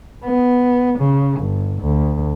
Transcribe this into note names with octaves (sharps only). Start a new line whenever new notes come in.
B3
C#3
G1
D2